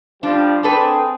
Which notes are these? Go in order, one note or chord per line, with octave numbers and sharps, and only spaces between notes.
F3 G3 D4
C4 D4 G#4 A4 B4